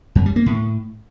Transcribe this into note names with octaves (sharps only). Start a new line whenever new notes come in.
F#2
G3
A#3
A2